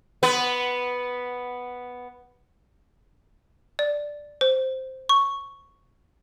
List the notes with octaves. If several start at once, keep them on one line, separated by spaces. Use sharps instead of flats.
B3 B4
D5
C5
C#6